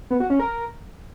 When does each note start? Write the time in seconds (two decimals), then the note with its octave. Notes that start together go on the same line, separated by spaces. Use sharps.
0.11 B3
0.20 F#4
0.30 C#4
0.40 A#4